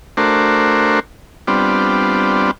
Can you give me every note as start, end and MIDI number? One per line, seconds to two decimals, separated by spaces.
0.17 1.00 57
0.17 1.00 62
0.17 1.00 66
0.17 1.00 70
0.17 1.00 72
1.48 2.51 55
1.48 2.51 59
1.48 2.51 60
1.48 2.51 62
1.48 2.51 65